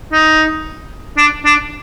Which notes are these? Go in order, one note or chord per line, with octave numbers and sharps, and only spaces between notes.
D#4
D4
D4